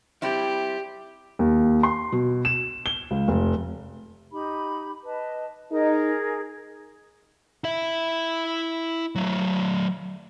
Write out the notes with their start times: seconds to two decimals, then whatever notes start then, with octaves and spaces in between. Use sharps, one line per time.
0.22 G3 C4 E4 G4
1.39 D#2
1.83 C6
2.12 B2
2.45 E7
2.86 G7
3.11 C#2
3.28 F1
4.32 D#4 G4 B5
5.05 B4 D#5 A5
5.71 D#4 G#4 A#4
7.64 E4 E5
9.15 F#3 A3